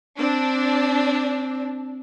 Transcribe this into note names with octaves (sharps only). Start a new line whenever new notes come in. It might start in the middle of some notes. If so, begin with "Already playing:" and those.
C4 D4